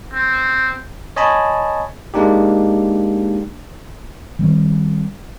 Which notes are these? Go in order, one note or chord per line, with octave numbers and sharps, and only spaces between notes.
C4
C#5 D#5 G#5 A5 B5
G#3 A#3 D4 D#4 G4
D#3 G3 C4